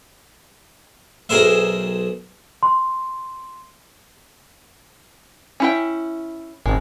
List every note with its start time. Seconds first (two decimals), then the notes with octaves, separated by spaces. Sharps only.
1.29 B1 G#4 A#4 C5 E5
2.63 C6
5.60 C#4 E4 G5
6.66 G#1 G#3